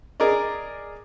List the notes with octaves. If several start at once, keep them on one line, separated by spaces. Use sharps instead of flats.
G#4 A#4 D5 D#5